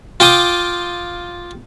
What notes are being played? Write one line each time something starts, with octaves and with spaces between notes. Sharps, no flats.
F4 G5 D6 D#6